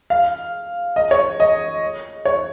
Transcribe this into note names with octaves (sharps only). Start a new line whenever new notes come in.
F5
D#5
C#5
D#5
C#5